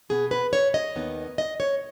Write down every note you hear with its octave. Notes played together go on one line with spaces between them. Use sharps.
B2 B3 G#4
B4
C#5
D#5
D#2 D#3 B3
D#5
C#5